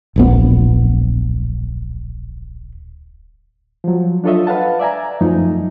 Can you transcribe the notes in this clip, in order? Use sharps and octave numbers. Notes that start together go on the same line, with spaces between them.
D1 A#1 B3
F3 F#3
D4 F4 A4 C#5 D#5 E5
B4 F5 F#5 A5
D5 E5 G#5 A#5
F#2 F3 A3 D#4